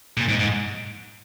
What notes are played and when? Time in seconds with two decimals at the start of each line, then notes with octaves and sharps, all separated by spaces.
0.17 A#2
0.29 G#2
0.40 G#2